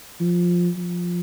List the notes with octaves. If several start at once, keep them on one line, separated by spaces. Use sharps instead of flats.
F3
F3